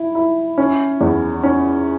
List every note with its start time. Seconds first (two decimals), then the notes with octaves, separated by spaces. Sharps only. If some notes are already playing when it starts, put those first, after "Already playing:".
Already playing: E4
0.15 E4
0.58 C#4
1.01 E2
1.43 C#4